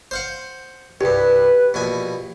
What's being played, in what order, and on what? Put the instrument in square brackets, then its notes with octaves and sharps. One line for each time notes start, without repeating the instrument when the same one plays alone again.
[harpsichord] C5 F5 F#5
[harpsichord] C2 G2 [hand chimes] G4 [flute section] B4
[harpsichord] A#1 B2 G#5